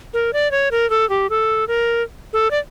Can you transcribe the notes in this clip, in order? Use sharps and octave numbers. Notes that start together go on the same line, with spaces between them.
A#4
D5
C#5
A#4
A4
G4
A4
A#4
A4
D5